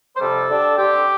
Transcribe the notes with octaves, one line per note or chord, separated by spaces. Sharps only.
C5
F2 C3 G3 A4
D3 G3 D4
D3 G3 C4 G4